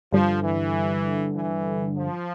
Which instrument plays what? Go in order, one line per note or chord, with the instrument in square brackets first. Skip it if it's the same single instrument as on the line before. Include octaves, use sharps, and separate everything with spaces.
[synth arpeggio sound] G2 D3 G3 [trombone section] F3
[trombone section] E3
E3
F3